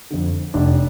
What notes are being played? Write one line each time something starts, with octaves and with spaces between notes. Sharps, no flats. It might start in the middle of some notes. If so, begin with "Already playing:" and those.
F2 D3
F1 D4